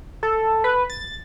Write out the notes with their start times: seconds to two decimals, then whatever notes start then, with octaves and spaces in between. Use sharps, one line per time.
0.23 A4
0.64 B4
0.90 A6